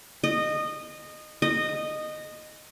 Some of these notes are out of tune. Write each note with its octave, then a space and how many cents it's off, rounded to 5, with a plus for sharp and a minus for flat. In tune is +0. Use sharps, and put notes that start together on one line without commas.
D#5 -20
D#5 -15